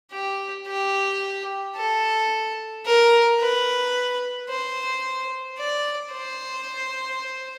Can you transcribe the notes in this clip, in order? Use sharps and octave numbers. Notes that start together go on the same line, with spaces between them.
G4
G4
A4
A#4
B4
C5
D5
C5